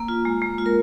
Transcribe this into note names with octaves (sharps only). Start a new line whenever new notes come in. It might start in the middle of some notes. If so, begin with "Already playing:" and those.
Already playing: A#3
F4
G#3
G#3
F4
A#4